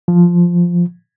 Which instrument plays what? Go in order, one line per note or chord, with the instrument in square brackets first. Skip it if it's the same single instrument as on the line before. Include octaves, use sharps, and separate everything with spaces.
[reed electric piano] F3